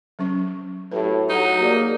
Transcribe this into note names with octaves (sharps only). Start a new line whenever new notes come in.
F#3 C#4 C#6
A2 F#4 G4 B4
F#3 D#4
A#3 G4 G#4 D5